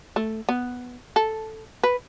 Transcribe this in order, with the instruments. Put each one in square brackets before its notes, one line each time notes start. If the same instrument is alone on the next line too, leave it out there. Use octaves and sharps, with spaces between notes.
[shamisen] A3
B3
A4
B4